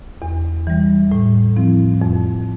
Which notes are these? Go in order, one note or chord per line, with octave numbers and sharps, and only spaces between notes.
E2
E3 G3
A2
F3 C4 E4
F2